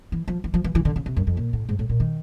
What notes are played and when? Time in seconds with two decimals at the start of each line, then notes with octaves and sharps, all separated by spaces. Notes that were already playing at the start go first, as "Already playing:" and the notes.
0.12 E3
0.28 F3
0.44 E3
0.54 F3
0.64 E3
0.75 E3
0.85 D3
0.96 C#3
1.06 C3
1.17 F#2
1.27 F2
1.37 A#2
1.53 A2
1.69 G#2
1.79 A2
1.89 A#2
2.00 D#3